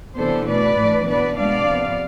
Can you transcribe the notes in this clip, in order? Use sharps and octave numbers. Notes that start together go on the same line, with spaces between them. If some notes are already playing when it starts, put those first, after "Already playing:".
C3 E3 B3 D4 A4 C5
B2 A3 D4 B4 D5
A2 E3 A3 D4
B2 B3 D4 B4 D5
B2 G#3 B3 D4 D5 F5
C3 F3 B3